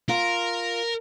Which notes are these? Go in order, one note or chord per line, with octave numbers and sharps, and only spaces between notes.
F4 A#4